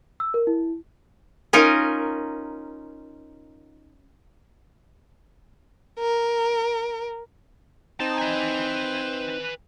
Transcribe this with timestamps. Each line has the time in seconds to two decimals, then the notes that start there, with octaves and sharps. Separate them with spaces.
0.20 E6
0.34 A#4
0.47 E4
1.53 C#4 D#4 F4 A#4
5.99 A#4
8.00 C4 D#4 A5
8.19 B4 G#5